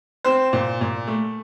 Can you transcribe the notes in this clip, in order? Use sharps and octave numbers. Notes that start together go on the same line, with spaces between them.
C4 C5
A#2
A#2
A3